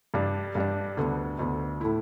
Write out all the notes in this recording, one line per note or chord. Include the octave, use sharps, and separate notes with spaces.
G2 G3 D4
G2 G3 D4
D2 D3 B3
D2 D3 B3
A2 A3 E4